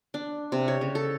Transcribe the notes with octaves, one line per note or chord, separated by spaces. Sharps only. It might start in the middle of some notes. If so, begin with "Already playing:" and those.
D4
C3
C#5
C#3
A4